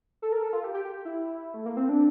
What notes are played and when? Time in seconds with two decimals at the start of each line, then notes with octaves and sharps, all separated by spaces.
0.22 A4
0.32 A#4
0.43 A4
0.53 F4
0.64 G4
0.74 G4
0.85 G4
1.05 E4
1.54 A3
1.66 A#3
1.77 C4
1.89 D4